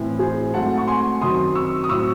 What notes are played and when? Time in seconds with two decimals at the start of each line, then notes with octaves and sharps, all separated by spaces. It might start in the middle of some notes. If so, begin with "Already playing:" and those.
Already playing: A2 E3 C4
0.19 G#4 C5
0.54 G#2 F#3 A3 C4 F#5 A5
0.77 C#6
0.87 G#5 C6
1.21 F#2 D#3 F#3 C4 C6 D#6
1.55 C#6 E6
1.84 D#6
1.89 A2 F#3 C4 C#6 E6